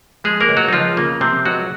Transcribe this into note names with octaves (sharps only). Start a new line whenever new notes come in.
F3 G#3 G#4
A#3 A#4
C#2
F#3 F#4
D#4
C#2 F3 F4
C#3 A#3
C3 F3 C4
C#2 F#3 F#4